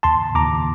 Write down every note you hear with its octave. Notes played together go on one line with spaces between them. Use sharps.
D#2 A5 C6
D#2 A#5 D6